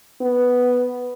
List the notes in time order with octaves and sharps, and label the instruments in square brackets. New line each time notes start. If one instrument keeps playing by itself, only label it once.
[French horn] B3